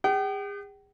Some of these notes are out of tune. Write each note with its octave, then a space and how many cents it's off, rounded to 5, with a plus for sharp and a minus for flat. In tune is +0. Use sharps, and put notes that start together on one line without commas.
G#4 -40 G5 -40